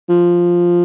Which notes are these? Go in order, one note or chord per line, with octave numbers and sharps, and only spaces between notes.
F3